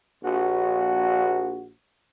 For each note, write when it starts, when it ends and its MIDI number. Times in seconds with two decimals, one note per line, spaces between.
0.25 1.70 34
0.25 1.70 66